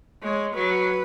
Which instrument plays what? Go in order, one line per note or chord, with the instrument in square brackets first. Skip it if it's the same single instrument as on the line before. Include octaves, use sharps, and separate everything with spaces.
[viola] G#3 [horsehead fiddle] C#5
[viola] F#3 [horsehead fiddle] B4